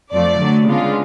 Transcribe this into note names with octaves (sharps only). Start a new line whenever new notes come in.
F2 F3 A3 D5
D3 F#3 A3
C#3 G#3 B3 D4 F4